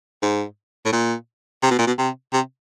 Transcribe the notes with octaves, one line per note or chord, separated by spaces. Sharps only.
G#2
A2
A#2
C3
B2
A#2
B2
C3
C3